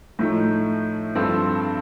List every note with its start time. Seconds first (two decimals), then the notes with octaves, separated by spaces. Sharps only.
0.19 A2 F3 A3 D#4
1.15 G2 F3 C4 F4 A4